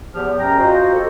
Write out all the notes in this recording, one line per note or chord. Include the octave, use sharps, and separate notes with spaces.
E2 F3 G4 F6
F#2 G5 A#5
F4 F#4 C5 D#5
G4 A4